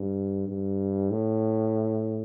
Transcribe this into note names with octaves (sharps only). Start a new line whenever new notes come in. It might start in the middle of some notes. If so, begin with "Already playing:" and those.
Already playing: G2
G2
A2